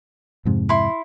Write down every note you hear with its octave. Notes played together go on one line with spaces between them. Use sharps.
F2 G#2 C3
E4 C6